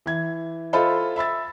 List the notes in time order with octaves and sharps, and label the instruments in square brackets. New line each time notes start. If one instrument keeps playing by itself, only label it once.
[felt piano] E3 G#6
F4 A4 C5 D#5 E5 B5
E5 B5 E6 A6